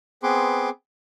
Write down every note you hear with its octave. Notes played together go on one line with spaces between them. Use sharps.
B3 C4 G#4 B4 C6 D6